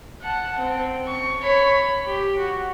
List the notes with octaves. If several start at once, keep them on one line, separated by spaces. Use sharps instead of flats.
F#5 A5
C4
C#6
C#5 B5
G4
F#4